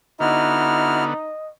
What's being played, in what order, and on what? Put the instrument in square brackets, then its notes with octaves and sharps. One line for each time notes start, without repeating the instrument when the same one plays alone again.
[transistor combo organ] D3 B3 [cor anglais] D#4 [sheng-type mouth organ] E4 F#4 F6 [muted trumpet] D#5